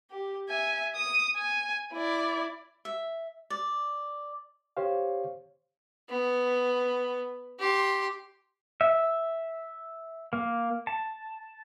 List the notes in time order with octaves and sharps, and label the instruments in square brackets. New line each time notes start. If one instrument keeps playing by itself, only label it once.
[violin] G4
E5 G#5
D#6 D#7
G#5
E4 D5
[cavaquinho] E5
D5
[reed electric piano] G4 C5 C#5 F5
[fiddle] B3
G4 C6
[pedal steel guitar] E5
A#3
A5